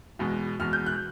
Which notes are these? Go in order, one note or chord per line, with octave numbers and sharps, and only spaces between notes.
E2 B2 G#3
E2 B2 G#3 F6
G6
F#6